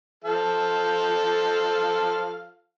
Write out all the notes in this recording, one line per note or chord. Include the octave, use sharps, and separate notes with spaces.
F3 A4 F5